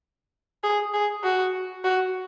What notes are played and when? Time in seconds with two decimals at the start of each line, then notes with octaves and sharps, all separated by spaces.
0.63 G#4
0.94 G#4
1.23 F#4
1.84 F#4